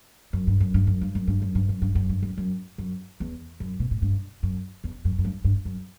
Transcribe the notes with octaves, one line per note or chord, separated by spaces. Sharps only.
F#2
G2
F#2
G2
F#2
G2
F#2
G2
F#2
G2
F#2
G2
F#2
G2
F#2
F#2
F#2
E2
F#2
B2
A2
G2
F#2
E2
F#2
F#2
G2
G2
F#2